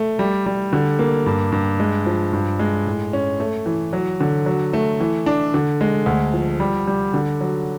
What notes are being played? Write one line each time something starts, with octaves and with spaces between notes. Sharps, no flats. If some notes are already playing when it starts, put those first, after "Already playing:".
Already playing: A3
G3
G3
D3
A#3
G2
G2
G#3
F3
G2
G#3
A2
C#4
A3
E3
F#3
D3
F#3
A3
E3
D4
D3
G#3
D2
F3
G3
G3
D3
F#3